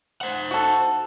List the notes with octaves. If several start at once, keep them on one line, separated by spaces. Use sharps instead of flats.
C5 F#5
F#4 A4